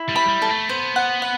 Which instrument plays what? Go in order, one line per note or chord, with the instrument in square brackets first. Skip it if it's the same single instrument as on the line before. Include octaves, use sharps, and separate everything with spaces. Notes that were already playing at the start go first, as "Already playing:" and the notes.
Already playing: [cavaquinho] E4
[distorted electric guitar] G3
[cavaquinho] B5
[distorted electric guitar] G3
[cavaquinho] A4
[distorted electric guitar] A3
[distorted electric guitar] B3 [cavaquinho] C5
[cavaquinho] F#5
F#5